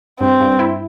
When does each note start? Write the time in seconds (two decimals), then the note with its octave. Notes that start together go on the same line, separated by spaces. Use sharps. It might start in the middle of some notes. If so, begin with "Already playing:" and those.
0.20 G2 C4
0.41 G2
0.59 E4